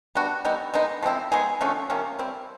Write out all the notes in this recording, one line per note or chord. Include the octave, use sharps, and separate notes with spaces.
G3 B3 D4 F#4
E3 G3 B3 D#4
G#3 B3 D#4
F3 G#3 C4 E4
G#3 B3 D#4 G#4
D3 F3 A3 C#4
C3 F3 A#3 C#4
G3 C4 E4